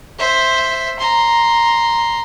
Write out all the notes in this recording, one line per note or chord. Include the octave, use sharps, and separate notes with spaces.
C5 E5
A#5 C6